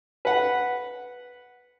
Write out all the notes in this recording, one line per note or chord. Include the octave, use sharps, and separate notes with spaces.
B4 F#5